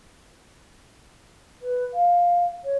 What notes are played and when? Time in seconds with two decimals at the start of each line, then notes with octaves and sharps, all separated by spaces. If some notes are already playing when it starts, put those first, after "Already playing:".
1.61 B4
1.93 F5
2.63 C#5